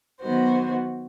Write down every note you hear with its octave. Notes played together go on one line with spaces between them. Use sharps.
D#3 F#3 B3 F#4 C5